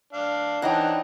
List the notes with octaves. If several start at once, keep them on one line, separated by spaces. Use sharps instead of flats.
D4 F5
E3 D4 D#4 C5 C#5 D#5 F#5 G5